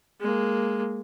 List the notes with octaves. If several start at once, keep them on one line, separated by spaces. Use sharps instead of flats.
G#3 A#3